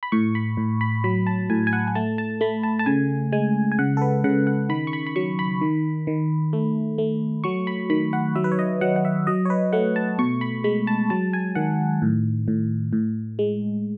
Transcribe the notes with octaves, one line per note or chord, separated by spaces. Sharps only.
B5
A2 C#6
B5
A2
B5
F#3 B5
A5
A2 G#5
G#5
F#5
G#5
A3 A5
A5
A3 B5
A5
A5
C#3 G#5
G#3 G#5
G#5
C#3 F#5
A4
B4
C#3 F#5
F#5
D#3 B5
C#6
B5
B5
F#3 C#6
B5
D#3
D#3
A3
A3
F#3 C#6
B5
D#3 B5
F#5
F#3 E5
B4
C#5
D#5
F#3 F#5
F#5
E5
F#3 D#5
C#5
B4
A3 F#5
A5
B2 C#6
B5
G#3 B5
A5
F#3 A5
G#5
D#3 F#5
A2
A2
A2
G#3